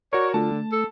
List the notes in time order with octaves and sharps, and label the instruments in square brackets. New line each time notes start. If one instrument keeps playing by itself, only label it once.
[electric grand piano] F#4 A#4 [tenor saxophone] C#5 [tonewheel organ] D5 C#6
[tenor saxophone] D3 [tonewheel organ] A3 F4 [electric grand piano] A5
[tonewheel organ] A3
[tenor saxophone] A4